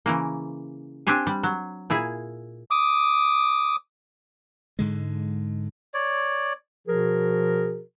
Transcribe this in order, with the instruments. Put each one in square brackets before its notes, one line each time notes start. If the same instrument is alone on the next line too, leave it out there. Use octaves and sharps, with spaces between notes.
[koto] C#3 E3 A#3
C4 D4 G4 C5 G#5
G3
F#3
A#2 E4 G#4
[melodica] D6 D#6
[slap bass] G#2 D3 G#3
[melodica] C#5 D5
[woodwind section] B2 F3 F#4 G#4 A#4